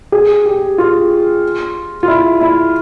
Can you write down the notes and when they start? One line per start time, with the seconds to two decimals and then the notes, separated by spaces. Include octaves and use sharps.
0.12 G#4
0.46 G4
0.78 F4
2.03 F4
2.08 E4
2.41 E4